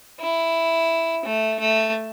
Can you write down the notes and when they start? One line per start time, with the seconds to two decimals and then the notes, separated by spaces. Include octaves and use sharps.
0.20 E4
1.25 A3
1.60 A3